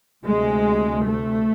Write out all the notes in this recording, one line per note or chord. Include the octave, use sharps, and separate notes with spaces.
D2 C3 G#3
A3